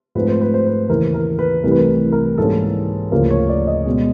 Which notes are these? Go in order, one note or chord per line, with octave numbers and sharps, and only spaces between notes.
G#2 F3 A3 C4 B4
C5
B4
C5
B4
D#2 C#3 E3 A#4
A#4
B4
C2 C3 E3 A3 A#4
B4
A#4
A#4
G#2 E3 G3 A#3 C#4 A4
D2 C#3 F3 A#3 A#4
C#5
D5
D#5
B2 G#3 C#4